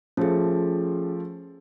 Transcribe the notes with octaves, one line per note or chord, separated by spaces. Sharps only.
F3 A3 C#4 F4 G#4